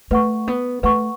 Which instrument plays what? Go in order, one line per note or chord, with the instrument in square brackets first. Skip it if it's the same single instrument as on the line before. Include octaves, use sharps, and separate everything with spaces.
[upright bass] A3 [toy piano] B4 F#5 C#6
[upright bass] B3
[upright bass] A3 [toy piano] B4 F#5 C#6